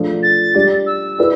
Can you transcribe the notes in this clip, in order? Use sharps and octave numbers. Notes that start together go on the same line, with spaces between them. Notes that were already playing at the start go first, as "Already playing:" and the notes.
Already playing: F3 A3 D4 F4 A4
A6
G3 D4 G4 D5
E6
E4 B4 D5